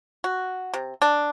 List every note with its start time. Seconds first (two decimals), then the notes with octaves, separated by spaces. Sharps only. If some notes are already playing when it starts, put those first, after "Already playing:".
0.24 F#4
0.74 C3
1.02 D4